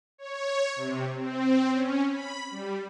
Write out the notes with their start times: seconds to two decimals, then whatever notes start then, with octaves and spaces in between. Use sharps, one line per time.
0.18 C#5
0.76 C3
1.14 C4
1.72 C#4
2.10 B5
2.51 G3